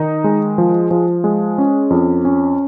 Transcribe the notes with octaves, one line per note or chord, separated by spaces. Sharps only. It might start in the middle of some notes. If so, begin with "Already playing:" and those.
Already playing: D#3 D#4
G#3
F3
F3
G#3
C#4
F2
C#4